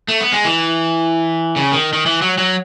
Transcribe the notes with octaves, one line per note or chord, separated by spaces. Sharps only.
A3
B3
G#3
E3
C#3
D#3
D#3
E3
F#3
F#3